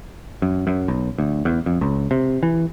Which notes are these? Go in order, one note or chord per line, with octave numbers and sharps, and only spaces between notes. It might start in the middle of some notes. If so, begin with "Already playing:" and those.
F#2
F#2
B1
D2
E2
F2
C#2
C3
E3